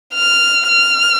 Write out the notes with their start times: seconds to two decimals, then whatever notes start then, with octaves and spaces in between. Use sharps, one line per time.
0.14 F6
0.68 F6